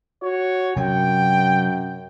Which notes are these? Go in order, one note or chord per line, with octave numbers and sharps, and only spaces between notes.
F#4 C#5
F#2 C3 F#3 G5